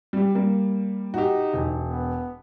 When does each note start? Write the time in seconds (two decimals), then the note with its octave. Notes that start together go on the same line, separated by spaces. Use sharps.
0.13 G3 G4
0.35 G3 A#3
1.14 D#4 F#4 G4
1.53 E1
1.87 B3